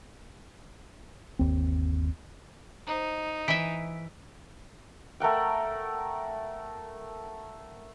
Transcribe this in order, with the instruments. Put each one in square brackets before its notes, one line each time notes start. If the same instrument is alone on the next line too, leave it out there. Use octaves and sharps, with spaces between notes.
[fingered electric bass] G1 D#2 C4
[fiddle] D#4 [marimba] C5 D#5 A#5
[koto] E3 E5 [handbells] B6 D7
[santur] A3 A#4 F#5 G5